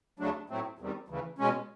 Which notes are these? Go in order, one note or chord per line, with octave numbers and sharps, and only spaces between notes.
D2 C#3 F#3 A3 D4
A2 F#3 A3 C4
E2 C3 D#3 G3
D2 C#3 E3
B2 G#3 C#4